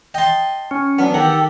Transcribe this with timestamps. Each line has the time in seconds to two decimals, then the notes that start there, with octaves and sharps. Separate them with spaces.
0.14 D#5 G5 A5 C6
0.71 C#4
0.99 F#3 B3 D4
1.14 D#3 G4 A4 F#5